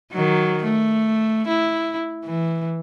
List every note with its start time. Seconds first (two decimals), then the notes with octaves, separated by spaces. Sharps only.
0.12 D#3 F#3
0.63 A3
1.48 E4
2.25 E3